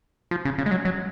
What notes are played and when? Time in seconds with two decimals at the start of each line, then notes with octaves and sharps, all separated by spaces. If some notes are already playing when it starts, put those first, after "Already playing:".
0.31 F3
0.45 C#3
0.58 C#3
0.66 G#3
0.71 F#3
0.85 F#3